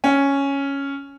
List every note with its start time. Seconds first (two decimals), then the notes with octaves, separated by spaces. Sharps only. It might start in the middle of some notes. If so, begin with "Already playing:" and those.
0.04 C#4